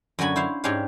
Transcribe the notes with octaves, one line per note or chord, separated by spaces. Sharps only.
F#2 D3 F#4 G#5 B5
E4 C5 F5
G#2 C#4 D4 G4 C#5 F5